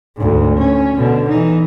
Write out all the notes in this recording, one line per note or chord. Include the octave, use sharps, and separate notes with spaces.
D2 G#2
C#4
B2 D3
E3 D#4